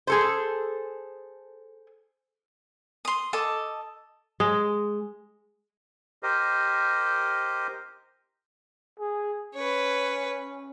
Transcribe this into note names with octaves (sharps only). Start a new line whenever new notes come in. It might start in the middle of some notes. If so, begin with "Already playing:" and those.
G#4 A4 C5
C6 D#6
A4 D#5 A5 D6
G#3
G4 A#4 C5 D#5
G#4
C#4 B4 C#5